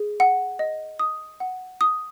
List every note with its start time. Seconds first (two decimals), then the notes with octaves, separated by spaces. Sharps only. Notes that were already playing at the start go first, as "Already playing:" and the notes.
Already playing: G#4
0.20 F#5
0.59 D#5
0.99 D#6
1.40 F#5
1.81 D#6